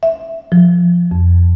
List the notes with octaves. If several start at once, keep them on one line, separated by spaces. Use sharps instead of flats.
E5
F3
F2